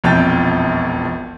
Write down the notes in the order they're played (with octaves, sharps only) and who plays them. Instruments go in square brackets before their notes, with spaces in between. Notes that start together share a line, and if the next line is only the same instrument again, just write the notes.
[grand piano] E1 A#1 F2 G5 G6 A6